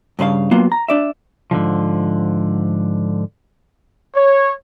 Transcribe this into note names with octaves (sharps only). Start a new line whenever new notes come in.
G2 C#3 B4 F5
F#3 A#3 B3 F4
A#5
D4 D5 E5
G#2 D3 D#3 F3
C#5